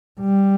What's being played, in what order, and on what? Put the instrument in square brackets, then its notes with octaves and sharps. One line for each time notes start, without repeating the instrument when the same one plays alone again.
[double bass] G3